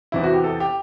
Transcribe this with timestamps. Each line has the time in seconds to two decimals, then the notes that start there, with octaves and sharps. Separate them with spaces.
0.12 E2 C3 E3 E4
0.24 F#4
0.34 G4
0.44 A4
0.60 G4